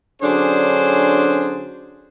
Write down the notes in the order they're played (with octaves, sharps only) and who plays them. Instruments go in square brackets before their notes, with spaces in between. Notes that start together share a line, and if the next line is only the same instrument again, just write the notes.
[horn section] D3 F#3 C#4 D4 G#4 C5